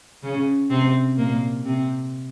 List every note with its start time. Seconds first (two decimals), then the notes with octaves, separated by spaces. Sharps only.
0.23 C#3 C#4
0.70 C3 C4
1.17 A#2 A#3
1.65 C3 C4